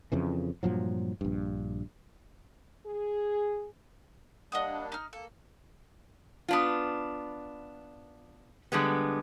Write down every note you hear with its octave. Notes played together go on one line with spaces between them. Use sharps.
F2 C#3 E3
G2 A#2 F3 F#3
A#1 G2
G#4
G3 A#3 D4 D#5 F#5 D#6
D#4 F6
A#3 A4
B3 D4 F4
D3 G3 G#3 B3